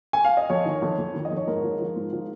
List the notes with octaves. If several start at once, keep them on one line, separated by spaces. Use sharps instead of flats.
G#5
F5
D#5
F2 C#5
D#3
F2
F2
D#3
D#5
F2
C#5
G#2 A#4
F3
F3
G#2
F3